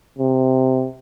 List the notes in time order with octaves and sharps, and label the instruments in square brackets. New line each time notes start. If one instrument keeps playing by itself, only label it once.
[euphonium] C3